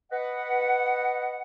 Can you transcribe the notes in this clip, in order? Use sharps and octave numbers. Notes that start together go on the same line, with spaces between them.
B4 D#5 F#5